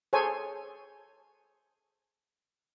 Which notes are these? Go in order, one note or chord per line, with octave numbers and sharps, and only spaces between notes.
G#4 A4 C5 C#5 G#5